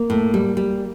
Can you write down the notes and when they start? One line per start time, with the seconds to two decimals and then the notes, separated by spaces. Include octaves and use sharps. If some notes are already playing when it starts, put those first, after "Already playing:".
Already playing: A#3
0.10 A2
0.34 G3
0.57 G3